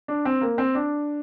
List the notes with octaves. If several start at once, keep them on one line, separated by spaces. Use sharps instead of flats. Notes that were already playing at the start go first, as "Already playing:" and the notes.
D4
C4
A#3
C4
D4